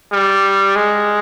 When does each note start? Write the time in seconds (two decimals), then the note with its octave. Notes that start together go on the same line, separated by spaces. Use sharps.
0.12 G3
0.76 G#3